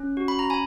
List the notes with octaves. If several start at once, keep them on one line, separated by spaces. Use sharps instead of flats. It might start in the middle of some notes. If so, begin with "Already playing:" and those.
Already playing: C#4
F#4
B5
A#5
G#5 B5